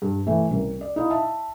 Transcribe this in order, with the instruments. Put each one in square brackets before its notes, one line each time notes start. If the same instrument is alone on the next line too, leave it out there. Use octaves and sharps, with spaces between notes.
[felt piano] G2
E3 A3
C2 C#3 A#4
D5
D#4 E4 F5
E5 A5